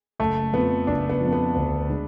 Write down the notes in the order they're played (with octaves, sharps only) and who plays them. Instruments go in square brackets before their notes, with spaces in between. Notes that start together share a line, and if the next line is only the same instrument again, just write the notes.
[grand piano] F#1 [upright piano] A3
[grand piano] F2 F3 [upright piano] B3
[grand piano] F#1 [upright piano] D4
[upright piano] B3
[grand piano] F2 F3
[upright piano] B3
[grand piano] D2
D3 G#3